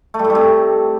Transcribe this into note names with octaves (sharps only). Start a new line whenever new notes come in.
A3
G3
A2
G3
C3